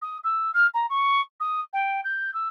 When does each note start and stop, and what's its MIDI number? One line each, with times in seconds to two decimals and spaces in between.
0.02 0.18 87
0.24 0.51 88
0.54 0.67 89
0.74 0.86 82
0.90 1.21 85
1.40 1.60 87
1.73 2.01 79
2.04 2.33 91
2.34 2.48 88